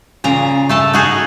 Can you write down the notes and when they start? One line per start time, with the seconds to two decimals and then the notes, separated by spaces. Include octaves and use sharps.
0.24 A#2 C#3 A#5
0.69 A3 A4 A5
0.93 D#4 F#4 G#4